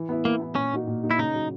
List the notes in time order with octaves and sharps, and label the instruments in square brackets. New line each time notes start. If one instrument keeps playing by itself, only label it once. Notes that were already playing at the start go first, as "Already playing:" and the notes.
Already playing: [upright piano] E3
B3 E4
[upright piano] E3 [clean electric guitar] A#3
[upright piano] B3 E4
[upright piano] A#2 [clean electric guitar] C#4
[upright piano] A#3 D#4 F#4
A#2
A#3 D#4 F#4
[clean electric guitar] E4
[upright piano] C#3 [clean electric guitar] D#4
[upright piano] F#3 A#3